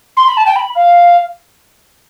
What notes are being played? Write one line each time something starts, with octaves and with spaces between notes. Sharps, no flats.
C6
B5
A5
G5
B5
F5